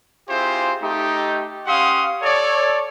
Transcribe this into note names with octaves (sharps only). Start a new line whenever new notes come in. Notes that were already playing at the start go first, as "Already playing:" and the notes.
C4 E4 F4 G4 G#4 C5
A3 D#4 G4
C#4 G4 F5 F#5 C6 D#6
A4 C#5 D5